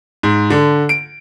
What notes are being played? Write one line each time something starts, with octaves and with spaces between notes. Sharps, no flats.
G#2
D3
D7